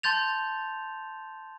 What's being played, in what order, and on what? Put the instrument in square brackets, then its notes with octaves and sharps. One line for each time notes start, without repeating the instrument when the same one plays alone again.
[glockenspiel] A5 C6 G6 A6 F7